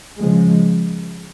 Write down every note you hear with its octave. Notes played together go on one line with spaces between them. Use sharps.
C#3 F3 G#3